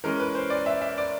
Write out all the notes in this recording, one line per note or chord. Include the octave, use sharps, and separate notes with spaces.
E3 G#3 C#4 A#4
B4
C5
D5
E5
E5
D5